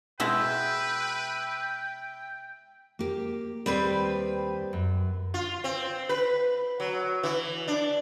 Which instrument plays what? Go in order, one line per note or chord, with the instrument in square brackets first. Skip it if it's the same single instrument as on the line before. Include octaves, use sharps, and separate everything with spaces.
[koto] B2 G#3 E4 [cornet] B4 [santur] E5 E6 [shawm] G5
[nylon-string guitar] A#3 G4
[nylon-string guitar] D#2 [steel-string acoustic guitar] G3 C4 B4
[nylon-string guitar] F#2
[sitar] F4
C4
B4
F#3
E3
D4